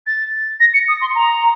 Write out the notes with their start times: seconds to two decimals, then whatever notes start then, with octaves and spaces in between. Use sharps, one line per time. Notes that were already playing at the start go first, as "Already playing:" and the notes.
0.06 A6
0.60 A#6
0.73 C#7
0.88 D#6
1.01 C6
1.15 A#5